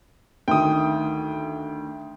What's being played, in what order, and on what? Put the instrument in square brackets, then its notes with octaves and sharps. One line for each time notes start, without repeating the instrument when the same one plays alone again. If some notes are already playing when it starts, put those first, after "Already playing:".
[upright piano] D2 D#3 [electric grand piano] G5 D#6